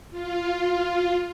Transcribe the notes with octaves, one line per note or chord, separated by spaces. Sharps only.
F4